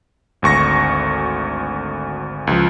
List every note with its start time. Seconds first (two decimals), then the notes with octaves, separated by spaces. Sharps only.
0.42 G#1 D2 C#6 A#6
2.47 C#2 F3